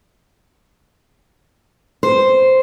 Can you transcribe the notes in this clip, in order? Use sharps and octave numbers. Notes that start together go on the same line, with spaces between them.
C5